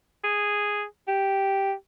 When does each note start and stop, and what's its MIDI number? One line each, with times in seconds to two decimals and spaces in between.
0.24 0.84 68
1.08 1.73 67